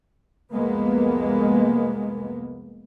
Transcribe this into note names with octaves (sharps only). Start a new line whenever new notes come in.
C2 F2 G#3 A#3 B3